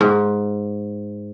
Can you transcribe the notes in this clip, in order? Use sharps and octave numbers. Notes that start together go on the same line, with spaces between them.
G#2